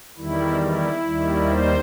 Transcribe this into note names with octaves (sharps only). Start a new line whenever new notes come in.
E2 D#3 G3 E4
E4
D#2 D#3 G3
C5